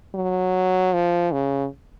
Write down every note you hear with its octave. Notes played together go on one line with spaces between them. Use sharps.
F#3
F3
C#3